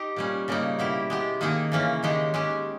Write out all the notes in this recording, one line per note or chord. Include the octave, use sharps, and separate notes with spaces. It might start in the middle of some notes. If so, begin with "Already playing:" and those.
Already playing: D#4 G4
A#2 G3 C#4
C#3 G3 A#3 D#4
B2 A#3 E4 G4
G#3 B3 G4
D#3 A#3 D#4 G#4
C#3 E3 A#3 C#4
D#3 G#3 D#4 G4
G#3 C#4 G4